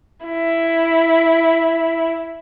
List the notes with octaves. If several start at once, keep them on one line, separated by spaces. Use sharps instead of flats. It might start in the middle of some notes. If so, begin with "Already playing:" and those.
E4